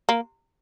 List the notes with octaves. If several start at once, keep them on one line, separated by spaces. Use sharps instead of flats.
A#3